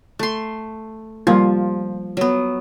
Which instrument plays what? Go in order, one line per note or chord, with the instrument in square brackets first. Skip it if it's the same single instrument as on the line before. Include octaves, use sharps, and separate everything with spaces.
[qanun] A3 C6
[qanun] F3 [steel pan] G3 A#3 F4
[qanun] F#3 B3